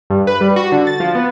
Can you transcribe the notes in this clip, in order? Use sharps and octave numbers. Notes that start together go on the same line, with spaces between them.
G2
B4
G3
F#4
D3
A6
F3
B3